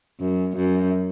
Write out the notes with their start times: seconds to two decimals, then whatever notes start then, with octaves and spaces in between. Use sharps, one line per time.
0.20 F#2
0.56 F#2